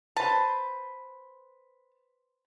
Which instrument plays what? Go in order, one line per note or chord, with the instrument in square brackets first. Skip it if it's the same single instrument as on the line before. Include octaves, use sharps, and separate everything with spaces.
[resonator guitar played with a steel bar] B4 C5 [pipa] A5